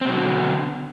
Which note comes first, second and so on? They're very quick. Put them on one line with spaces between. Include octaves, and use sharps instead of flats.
C4 B2 F#3 B3 D3